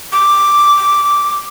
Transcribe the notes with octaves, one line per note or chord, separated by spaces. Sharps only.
D6